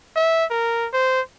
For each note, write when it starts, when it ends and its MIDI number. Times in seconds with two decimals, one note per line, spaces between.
0.16 0.45 76
0.50 0.88 70
0.93 1.21 72